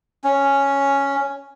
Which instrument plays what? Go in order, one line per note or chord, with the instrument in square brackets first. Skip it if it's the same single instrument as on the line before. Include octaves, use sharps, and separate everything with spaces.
[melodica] C#4